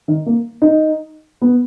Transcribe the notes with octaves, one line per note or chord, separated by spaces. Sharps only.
D#3
A#3
D#4
B3